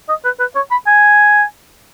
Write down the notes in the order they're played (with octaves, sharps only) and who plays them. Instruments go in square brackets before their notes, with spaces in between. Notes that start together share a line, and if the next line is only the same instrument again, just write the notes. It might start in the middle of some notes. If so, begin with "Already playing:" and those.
[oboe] D#5
B4
B4
C#5
B5
G#5